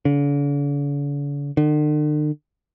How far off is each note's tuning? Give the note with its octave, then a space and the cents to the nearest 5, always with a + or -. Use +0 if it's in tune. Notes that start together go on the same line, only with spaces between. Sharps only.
D3 -45
D3 +45